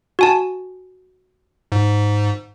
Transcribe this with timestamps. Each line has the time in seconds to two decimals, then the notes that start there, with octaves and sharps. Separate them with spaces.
0.19 F#4 G#5 A5
1.72 G#2